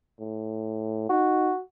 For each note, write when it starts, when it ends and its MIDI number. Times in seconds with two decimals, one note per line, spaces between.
0.20 1.07 45
1.10 1.52 63
1.10 1.59 66